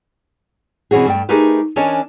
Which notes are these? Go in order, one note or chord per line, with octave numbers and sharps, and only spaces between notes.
B2 E3 C4 C#4 F#4 G#4
G2 A3 G5
A3 D#4 G4 G#4 A#4 B4
E3 C#4 D4 A#4 C#5 D#5